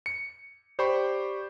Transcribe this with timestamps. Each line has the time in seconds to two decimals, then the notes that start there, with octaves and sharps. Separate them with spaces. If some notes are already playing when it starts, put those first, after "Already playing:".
0.06 C#7
0.79 G4 C5 D5 G5 B5 C#6